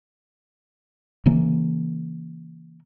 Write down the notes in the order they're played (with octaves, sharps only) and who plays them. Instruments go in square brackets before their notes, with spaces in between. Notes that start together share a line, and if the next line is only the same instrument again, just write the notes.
[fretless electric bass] C#3 E3 A#3